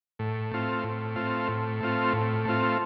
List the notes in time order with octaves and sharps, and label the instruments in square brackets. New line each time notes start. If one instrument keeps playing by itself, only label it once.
[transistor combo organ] A2
A3 C4 F4
A2
A3 C4 F4
A2
A3 C4 F4
A2
A3 C4 F4